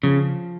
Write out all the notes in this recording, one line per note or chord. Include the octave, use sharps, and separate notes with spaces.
C#3 F3